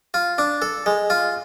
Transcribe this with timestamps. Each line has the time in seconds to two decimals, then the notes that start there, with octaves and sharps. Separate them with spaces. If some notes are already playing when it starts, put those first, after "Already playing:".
0.14 F4
0.38 D4
0.62 A4
0.86 G#3
1.10 F4